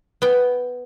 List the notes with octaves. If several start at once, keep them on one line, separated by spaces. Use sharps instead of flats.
B3 G5